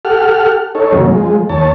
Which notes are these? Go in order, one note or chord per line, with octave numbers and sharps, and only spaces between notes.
G4 A4 F#5 F6
D#4 A4 C#5
F#2 C3 D#3 F#3 A#3 C#4
F3 G#3
D#2 C#5 A5